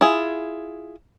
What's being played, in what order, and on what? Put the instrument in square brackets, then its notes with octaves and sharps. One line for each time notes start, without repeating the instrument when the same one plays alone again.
[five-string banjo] E4 F4 G#4